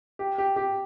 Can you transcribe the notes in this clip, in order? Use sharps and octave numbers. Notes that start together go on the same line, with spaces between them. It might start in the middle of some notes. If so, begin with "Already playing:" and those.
G4
G4
G4